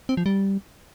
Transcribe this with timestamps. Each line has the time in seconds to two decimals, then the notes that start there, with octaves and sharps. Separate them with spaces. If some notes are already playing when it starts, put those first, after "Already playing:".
0.09 C4
0.17 F3
0.26 G3